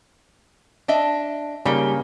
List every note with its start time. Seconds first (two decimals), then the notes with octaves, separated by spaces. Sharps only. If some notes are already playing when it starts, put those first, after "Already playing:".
0.88 D4 D#5 E5
1.65 C#3 G3 A#3 D#4 G4